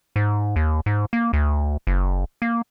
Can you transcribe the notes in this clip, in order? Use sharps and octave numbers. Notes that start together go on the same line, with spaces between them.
G#2
D#2
G#2
A#3
D2
F#1
A#3